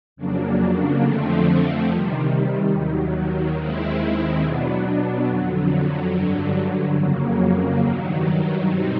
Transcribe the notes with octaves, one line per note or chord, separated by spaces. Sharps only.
F2 C#3 F#3 A#3 D4
F2 D3 F3 A3 C4
C3 D#3 G3
D#2 D#3 F#3
D#2 D#3 G#3 C4 E4
B2 F#3 B3 D4
F2 D3 F#3
G2 D3 F#3
F2 C#3 F#3 A#3
G2 D#3 F#3
B2 G3 C4 D#4